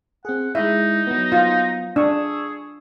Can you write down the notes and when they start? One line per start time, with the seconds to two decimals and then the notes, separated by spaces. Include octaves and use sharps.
0.25 C4 G#4 F#5
0.55 G#3 D#4 E4 E5
1.07 F#3 B3
1.32 F4
1.96 D4 G#4 C#6 E6